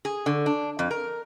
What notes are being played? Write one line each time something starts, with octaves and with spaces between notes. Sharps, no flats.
G#4
D3
D4
F2
A#4